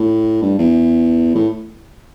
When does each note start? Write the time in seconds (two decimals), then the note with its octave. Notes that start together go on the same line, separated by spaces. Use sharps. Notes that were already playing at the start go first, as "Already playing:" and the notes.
Already playing: A2
0.43 G2
0.59 E2
1.35 A2